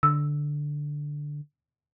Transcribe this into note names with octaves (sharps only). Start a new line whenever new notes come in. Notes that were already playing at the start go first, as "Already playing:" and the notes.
D3 E6